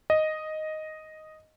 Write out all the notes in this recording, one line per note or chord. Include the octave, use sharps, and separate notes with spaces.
D#5